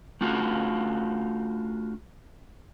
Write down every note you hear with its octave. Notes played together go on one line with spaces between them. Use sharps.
A3 D4 F4 F#4